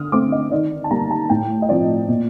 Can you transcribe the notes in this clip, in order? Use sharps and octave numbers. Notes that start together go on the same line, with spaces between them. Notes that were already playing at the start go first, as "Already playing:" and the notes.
Already playing: D3 D#6 F6
A3 C4 D6
D#5
D#3 D5
A5
G3 A#3 A#5
A5
A2 G5
D#5
F3 C4 D5
A#2